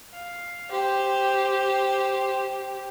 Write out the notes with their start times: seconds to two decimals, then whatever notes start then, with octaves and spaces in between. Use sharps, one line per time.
0.14 F5
0.71 G4 C5